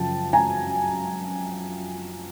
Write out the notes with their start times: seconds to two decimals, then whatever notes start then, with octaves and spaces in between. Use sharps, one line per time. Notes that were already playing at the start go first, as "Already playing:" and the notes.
Already playing: F#2 C#3 F3 G5 A5
0.33 G#5 A#5